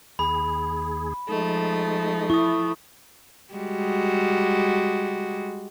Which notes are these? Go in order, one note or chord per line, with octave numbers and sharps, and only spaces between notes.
D#2 G#4 B5
F3 G#3 A3 D#4
E4 C#6 D#6
G3 G#3 F#4